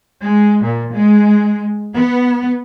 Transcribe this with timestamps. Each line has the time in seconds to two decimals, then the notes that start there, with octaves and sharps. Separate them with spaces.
0.23 G#3
0.64 A#2
0.93 G#3
1.97 B3